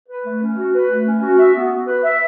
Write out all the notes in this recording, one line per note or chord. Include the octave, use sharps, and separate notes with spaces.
B4
A3
C#4
F#4
B4
A3
C#4
F#4
E5
B3
F#4
B4
E5